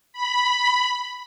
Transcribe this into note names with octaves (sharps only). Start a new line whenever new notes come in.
B5